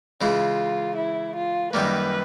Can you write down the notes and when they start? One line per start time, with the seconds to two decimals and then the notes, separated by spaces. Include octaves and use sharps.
0.21 C#3 E3 G#3 F4
0.97 E4
1.36 F4
1.73 F#2 D#3 G3 A#3 B4